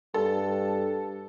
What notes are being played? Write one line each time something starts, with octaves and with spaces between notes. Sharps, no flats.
G2 A4